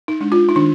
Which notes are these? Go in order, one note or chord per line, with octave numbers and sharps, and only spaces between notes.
D#4
G#3 D4
F4
D#4
D#3 D4